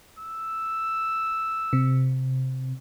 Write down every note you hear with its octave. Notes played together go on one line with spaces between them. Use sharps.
E6
C3